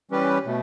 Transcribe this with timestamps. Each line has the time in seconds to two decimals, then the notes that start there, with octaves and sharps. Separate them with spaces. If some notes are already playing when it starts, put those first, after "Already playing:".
0.11 E3 G3 C#4 G4 B4
0.46 B2 A3